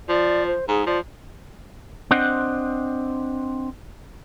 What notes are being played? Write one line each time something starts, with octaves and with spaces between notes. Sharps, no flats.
F3 D5
C5
G#2 G#4
F3 D5
C4 D4 C5 D#5 F#5